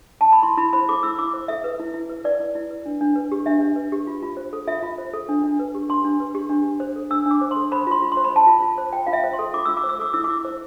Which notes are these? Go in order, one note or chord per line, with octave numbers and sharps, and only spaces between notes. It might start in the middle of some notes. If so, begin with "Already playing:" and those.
A5
B5
E4 C6
E4 B5
C5 B5
A4 D6
E4 E6
E4 D6
C5
A4 E5
B4
E4
E4
B4
B4 D5
E4
E4
B4
D4
D4
B4
G4
D4 E5
D4
B4
G4
F4
F4
C5
A4
F4 E5
F4
C5
A4
D4
D4
B4
G4
D4 C6
D4
B4
G4
D4
D4
C5
A4
D4 E6
D4 D6
C5
C6
A4
C5 B5
F4 C6
F4
C6
C5
B5
C5 A5
F4 B5
F4
C5
F4 G5
F4 F5
E5
C5
C6
A4
F4 D6
F4 E6
D6
C5
E6
A4 D6
E4 E6
D6
E4
C5